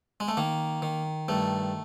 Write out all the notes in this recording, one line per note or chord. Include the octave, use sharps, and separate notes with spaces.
G#3
A3
D#3 A#3
D#3
G2 A3